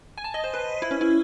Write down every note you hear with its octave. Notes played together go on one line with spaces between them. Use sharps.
G#5
A5
D#5
C5
B4
E4
C#4
E4